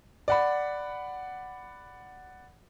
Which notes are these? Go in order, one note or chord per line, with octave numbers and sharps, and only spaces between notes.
D5 F#5 B5